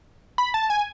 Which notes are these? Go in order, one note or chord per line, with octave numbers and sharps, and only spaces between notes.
B5
A5
G#5